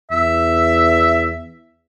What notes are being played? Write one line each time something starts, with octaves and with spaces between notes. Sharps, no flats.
E2 E5